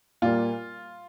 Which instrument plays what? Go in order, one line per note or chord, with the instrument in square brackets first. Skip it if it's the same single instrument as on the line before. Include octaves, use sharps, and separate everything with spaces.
[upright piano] A#2 G3 A#3 F4